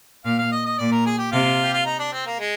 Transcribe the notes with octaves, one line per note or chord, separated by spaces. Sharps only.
A#2 F5
F5
D#5
D#5
A#2 D5
A#4
G#4
G4
C3 F4
G4
F4
D#4
D4
C4
A#3
G#3